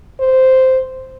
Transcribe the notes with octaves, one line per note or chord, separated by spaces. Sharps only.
C5